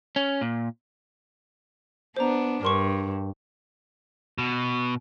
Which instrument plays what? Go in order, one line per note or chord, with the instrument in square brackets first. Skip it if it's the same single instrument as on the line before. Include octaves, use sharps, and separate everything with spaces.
[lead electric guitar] C#4
A#2
[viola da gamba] B3 D4 [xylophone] C5 A#5
[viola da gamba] G2 [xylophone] A#4 C6 C#6
[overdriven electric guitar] B2